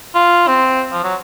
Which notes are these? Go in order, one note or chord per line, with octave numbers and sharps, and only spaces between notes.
F4
C4
F3
F#3